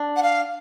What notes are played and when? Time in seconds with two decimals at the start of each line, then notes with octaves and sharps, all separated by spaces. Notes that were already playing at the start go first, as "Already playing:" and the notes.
Already playing: D4
0.16 F#5
0.22 F5